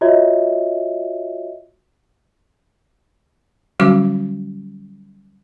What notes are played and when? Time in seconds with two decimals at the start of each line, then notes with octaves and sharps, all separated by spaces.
0.01 F4 F#4 C#5 D#5 E5
3.80 D3 F#3 G3 C#4 F#4 D6